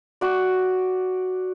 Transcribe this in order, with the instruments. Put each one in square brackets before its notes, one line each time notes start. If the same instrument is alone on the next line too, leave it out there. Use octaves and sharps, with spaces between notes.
[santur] F#4 D5